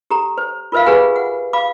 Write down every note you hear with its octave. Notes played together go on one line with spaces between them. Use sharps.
G4 A4 A#5
C5
F4 A#4 C5 E5 F5
G4 G#4 B4 F#5 G#5 B5
F#5
F5 B5 D6